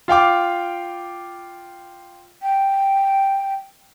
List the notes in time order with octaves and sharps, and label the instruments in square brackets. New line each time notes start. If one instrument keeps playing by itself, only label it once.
[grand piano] F4 F5 G5 D6
[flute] G5